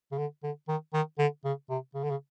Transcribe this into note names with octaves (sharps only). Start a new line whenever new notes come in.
C#3
D3
D3
D#3
D#3
D3
C#3
C3
C#3
D3
C#3